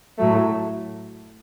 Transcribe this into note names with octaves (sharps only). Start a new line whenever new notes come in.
A2 F#3 A3